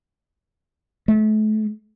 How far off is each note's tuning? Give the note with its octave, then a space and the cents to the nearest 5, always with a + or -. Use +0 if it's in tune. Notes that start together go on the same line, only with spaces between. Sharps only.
A3 -35